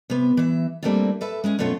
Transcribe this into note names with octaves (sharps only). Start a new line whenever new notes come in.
C3 B3
E3 E5
G3 A3 A#3 C4 D4 F4
A4 B4 E5
G#3 C#4 G#4
F#2 B2 A3 F4 C#5